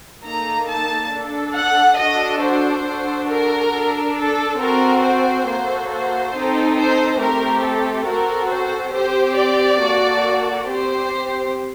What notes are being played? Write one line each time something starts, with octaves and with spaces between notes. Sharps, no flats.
A#3 D#4 A4 A#5
A5
D4 A4
F#5
D4 F#4 A4 D#5
C5
D4 F#4 A4
A#4
D4 A4
A4
C4 F#4 A4 A#4
C5
A#3 F#4 A4
C5
C4 D#4 A4
C5
A3 C4 G4 A#4
A4
C4 F#4 A4 A#4
C5
C4 G4 C5
D5
A#3 F#4 A4
C4 G4 C5